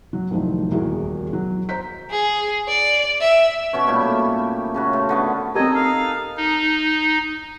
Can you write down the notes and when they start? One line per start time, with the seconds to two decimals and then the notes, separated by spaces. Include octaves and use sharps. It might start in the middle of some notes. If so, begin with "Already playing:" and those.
0.13 F#3
0.31 C2 F2 A2 D#3 F3 F#3
0.71 D#1 E2 E4 F#4 G#4 A#4
1.33 F#3
1.69 C5 A#5 G6 B6
2.11 G#4
2.68 D5
3.21 E5
3.73 B2 C#4 C#5
3.88 A#2 G3 A3 E4
4.39 G5
4.74 C#3 C#4 F#4
4.93 A3 F4
5.09 D3 B3 C#4
5.55 C4 D#4 G4 A4 A#4 D#5 A5 G#6
5.75 F5
6.37 D#4